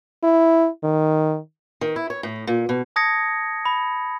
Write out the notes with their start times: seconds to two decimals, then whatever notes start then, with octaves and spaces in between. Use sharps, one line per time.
0.23 E4
0.83 D#3
1.81 D#3
1.96 E4
2.10 C#5
2.23 A2
2.47 A#2
2.69 B2
2.96 A5 D#6 G#6 A#6 C#7
3.65 B5